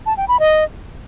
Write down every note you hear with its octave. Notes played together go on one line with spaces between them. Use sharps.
A5
G5
B5
D#5